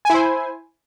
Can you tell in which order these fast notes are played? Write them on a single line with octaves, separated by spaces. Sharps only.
G#5 E4 C5